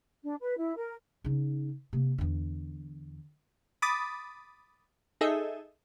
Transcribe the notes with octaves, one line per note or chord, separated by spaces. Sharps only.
D4
B4
E4
A#4
C#3 D#4
C3 A#3
E2 D3
B5 D6 D#6 A6
D#4 G#4 A4 D#5 E5